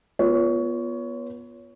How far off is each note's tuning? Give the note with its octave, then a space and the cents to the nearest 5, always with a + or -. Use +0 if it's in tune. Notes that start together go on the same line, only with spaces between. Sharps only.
B3 -20 F4 +0 C#5 +20